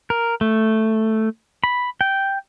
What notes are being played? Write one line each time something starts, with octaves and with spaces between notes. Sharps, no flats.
A#4
A3
B5
G5